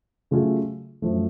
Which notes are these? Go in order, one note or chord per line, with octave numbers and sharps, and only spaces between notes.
C#3 F#3 A3 F4 G#4
F#2 F3 A3